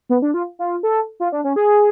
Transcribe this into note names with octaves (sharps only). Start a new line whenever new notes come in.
B3
D4
F4
F4
A4
F4
D4
C#4
G#4